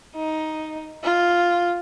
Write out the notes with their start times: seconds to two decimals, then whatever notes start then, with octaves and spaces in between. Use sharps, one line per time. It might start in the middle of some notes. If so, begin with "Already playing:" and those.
0.16 D#4
1.03 F4